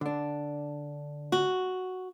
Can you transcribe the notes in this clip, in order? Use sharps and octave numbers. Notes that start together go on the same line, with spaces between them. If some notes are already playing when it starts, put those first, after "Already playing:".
D3 D4
F#4